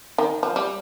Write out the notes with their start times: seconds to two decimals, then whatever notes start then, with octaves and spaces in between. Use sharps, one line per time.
0.18 D#3
0.43 F3
0.56 G3